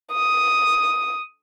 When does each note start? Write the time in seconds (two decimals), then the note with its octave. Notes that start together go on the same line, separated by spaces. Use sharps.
0.13 D#6